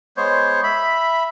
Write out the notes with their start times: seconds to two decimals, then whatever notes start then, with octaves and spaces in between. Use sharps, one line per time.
0.17 G#3 B3 C5 C#5
0.64 E5 B5